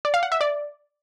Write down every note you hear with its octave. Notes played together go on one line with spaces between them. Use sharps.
D5
F5
F#5
E5
D5